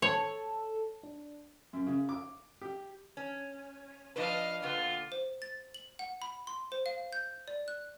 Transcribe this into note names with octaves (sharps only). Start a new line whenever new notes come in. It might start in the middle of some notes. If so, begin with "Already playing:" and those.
A4 C#5 A5
D4
F#2
C#3
D6
G4
C#4
F3 D4 B4 D#5 F5
A#2 D3 B3 F4
C5
A6
F#7
F#5
B5
C6
C5
F5
G6
D5
F#6